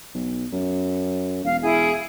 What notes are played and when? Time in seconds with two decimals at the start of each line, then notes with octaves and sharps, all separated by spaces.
0.14 B1
0.52 F#2
1.44 E1 F5
1.62 E4 G#4